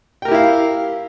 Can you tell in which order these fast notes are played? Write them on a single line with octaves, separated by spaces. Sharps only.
G5 A#4 G4 E4 F5